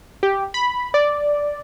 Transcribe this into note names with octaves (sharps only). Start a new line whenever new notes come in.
G4
B5
D5